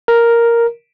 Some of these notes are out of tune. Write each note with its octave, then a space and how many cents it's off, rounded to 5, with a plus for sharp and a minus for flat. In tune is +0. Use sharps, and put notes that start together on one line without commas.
A#4 +0